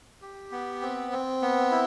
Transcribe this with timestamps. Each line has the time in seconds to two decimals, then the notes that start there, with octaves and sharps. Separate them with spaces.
0.22 G4
0.51 B3
0.82 C4
1.12 C4
1.42 B3
1.71 E4